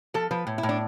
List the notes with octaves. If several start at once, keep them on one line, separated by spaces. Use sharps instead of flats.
F3 A4
F3 B4
A2
E4
A2
D4